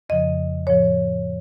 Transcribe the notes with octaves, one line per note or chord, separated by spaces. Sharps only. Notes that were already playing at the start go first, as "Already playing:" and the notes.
F2 C#3 F3 D#5
A2 F3 C#5